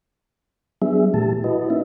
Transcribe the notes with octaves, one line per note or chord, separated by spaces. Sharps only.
F#3 G3 B3 D4 G#4 E5
A#2 E3 A3 G4 A5
E4 F#4 B4 D#5
A#3 C#4 D#4 E4 E5